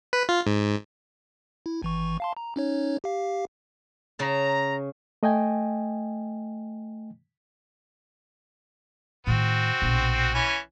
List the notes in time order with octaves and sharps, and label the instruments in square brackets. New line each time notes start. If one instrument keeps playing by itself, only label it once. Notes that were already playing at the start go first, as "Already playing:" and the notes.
[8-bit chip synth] B4
F4
G#2
E4
G#1 E3 C#6
F5 A5 C6
A#5
C#4 D#4 C#5
G4 F5
[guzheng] C#3 A5 [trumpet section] A#5
[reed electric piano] A3 D#5 G5 G#5
[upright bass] A2 D#3 [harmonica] C4 F#4
[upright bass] A#1 B2
[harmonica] E3 C#4 G#5